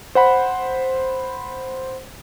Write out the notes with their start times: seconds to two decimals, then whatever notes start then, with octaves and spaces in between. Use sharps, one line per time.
0.15 C5 F#5 B5